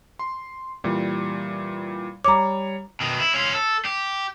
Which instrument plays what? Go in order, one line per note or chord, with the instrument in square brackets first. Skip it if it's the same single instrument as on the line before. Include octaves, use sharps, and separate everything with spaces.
[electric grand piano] C6
A#2 E3 G3
[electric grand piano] G3 C#5 [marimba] A#5 D6
[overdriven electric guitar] B2 D#3
E4
C#4 F4
A4
G4